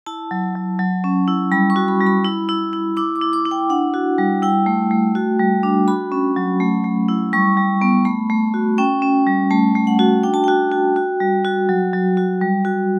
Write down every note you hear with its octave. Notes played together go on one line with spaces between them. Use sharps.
E4 A5
F#3
F#3
F#3
C#4
E4
G3 B5
C#6
F#4
B5
G3
B5
E4
E4
E4
E4 D6
D6
E4
D6
E4
G5
D4 F#5
F#4
G3
E4 G5
A3
A3
F#4
G3
D4
F#4 B5
C#4
F#3
A3
A3
E4
G3 C#6
G3
B3
A3 B5
A3
F#4
C#4 G5
C#4
G3
A3 A5
A3
F#5
F#4
D4 G5
A5
F#4 G5
F#4
F#4
G3
F#4
F#3
F#3
F#4
G3
F#4